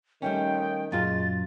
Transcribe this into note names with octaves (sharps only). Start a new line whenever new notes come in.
D#3 G3 A3 C#4 G5
F#2 A#2 G#3 F4 A6